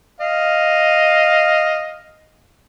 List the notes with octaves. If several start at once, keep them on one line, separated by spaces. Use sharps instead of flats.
D#5 F5